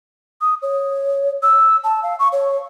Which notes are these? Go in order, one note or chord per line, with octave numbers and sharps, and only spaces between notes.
D#6
C#5
E6
A5
F5
C#6
C#5